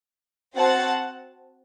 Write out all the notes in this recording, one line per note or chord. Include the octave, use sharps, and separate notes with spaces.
C4 F#4 C5 F#5 A5